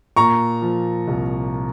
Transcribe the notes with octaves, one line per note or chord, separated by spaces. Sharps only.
A#2 A#5 C#6
F3
C2